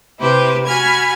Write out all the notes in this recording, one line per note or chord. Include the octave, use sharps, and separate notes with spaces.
C3 E4 G4 B4 C5
F#4 G#5 B5 F6 G#6